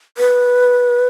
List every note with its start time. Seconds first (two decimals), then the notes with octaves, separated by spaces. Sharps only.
0.18 B4